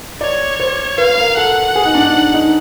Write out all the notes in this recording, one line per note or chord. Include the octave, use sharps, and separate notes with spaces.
C#5 D5
C5
B4 F5
A#4
A4 F#5
G#4
D#4
D4
D#4
D4
D#4